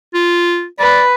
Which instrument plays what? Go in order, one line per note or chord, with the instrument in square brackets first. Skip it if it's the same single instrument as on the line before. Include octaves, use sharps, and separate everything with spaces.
[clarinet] F4
[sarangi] B4 [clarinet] D5